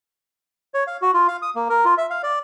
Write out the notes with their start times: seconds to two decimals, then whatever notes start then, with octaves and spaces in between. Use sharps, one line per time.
0.74 C#5
0.87 F5
1.02 F#4
1.14 F4
1.28 F5
1.42 D#6
1.56 A#3
1.70 A#4
1.85 F4
1.98 E5
2.10 F5
2.23 D5